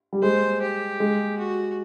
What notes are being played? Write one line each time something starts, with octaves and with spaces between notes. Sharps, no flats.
G3
G#3 C5
G4
G#3
F#4